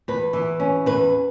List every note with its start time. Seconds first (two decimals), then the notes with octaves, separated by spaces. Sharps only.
0.08 E2 B4
0.33 E3
0.60 C#4
0.86 E2 B4